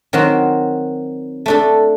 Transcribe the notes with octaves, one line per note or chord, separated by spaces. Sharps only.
D#3 F#3 C4 F#4
A3 D4 A4